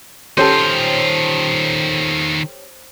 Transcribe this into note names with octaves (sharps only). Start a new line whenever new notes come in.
D#3 C#4 F4 G4 A4 C5